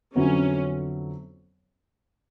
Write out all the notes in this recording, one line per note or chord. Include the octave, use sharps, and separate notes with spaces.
F2 D3 F#3 B3 C#4 E4